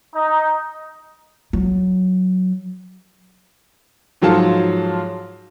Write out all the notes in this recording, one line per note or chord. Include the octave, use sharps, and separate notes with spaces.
D#4
F#3
G#2 F3 F#3 A4 F5 A5